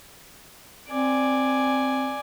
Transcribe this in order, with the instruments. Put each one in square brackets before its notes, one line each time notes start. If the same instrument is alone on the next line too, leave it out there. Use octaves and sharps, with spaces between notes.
[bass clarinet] C4 [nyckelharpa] D5 G#5